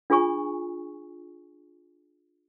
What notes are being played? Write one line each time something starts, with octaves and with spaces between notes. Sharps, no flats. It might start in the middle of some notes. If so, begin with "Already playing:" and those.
D4 F4 G#4 G#5 C#6